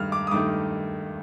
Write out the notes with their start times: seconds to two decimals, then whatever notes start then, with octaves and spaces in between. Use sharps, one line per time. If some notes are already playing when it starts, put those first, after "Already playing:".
Already playing: G2 D#3 A3 F6
0.12 D6
0.27 D#6
0.31 G2 D#3 A3 D6